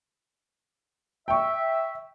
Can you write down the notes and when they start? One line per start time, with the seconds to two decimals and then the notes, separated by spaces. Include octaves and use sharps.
1.28 E5 G5 C#6